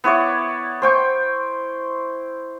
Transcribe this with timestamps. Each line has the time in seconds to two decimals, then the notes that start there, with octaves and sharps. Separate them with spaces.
0.04 B3 E4 C#5 D5
0.82 C5 G5 C#6